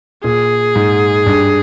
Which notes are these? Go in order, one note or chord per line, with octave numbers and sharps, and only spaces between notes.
A#2 G#4
G#2
G2